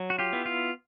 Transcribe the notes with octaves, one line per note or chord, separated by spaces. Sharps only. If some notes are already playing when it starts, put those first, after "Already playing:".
Already playing: F#3
F#4
F4 G4
B3 E4
F4